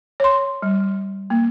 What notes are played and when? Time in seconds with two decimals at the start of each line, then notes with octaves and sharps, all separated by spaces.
0.20 C#5 C6
0.62 G3
1.30 A#3